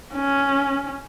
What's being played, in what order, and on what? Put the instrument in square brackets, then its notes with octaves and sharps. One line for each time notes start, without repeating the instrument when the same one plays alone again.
[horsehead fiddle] C#4